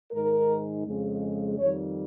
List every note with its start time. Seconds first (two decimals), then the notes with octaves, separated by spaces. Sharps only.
0.11 G#2 D#3 G#3 A#4
0.85 F2 C#3 G#3
1.58 F2 D#3 G3 C#5